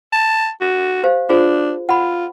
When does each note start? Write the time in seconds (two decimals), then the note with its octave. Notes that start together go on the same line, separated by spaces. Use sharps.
0.13 A5
0.61 F#4
1.03 G4 C5 F5
1.29 D4 F4 G#4 C5
1.89 F4 F#5 B5